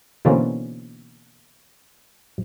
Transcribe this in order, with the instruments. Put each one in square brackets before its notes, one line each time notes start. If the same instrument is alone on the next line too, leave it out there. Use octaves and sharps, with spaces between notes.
[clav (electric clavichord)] B2 D3 E3 A#3 C4 C#4